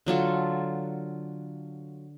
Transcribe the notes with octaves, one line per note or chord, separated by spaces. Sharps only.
D3 F#3 F4 A4